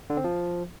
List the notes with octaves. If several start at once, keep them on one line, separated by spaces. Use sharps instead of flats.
D3
C4
F3